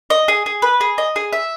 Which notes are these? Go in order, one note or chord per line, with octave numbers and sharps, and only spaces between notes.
D#5
G#4
G#4
B4
G#4
D#5
G#4
E5